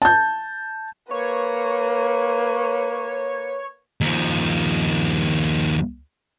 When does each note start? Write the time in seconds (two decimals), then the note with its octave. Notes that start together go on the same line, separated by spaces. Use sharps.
0.02 A5 G6
1.11 A#3 B4 C#5
4.01 D#2 F3